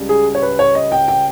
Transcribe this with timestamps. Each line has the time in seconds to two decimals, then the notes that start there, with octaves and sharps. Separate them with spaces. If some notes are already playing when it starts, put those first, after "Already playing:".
Already playing: C#2 C#3 G3
0.09 G#4
0.35 C#5
0.42 B4
0.59 C#5
0.75 D#5
0.92 G5
1.08 G5